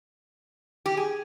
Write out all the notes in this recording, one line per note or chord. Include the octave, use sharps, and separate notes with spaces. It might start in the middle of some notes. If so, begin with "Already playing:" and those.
G4
G#4